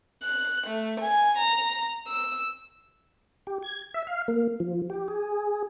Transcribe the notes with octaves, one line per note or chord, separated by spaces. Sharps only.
F#6
A3
G#5
A#5
E6
G4
G#6
E5
F5
A#3
F3
G4
G#4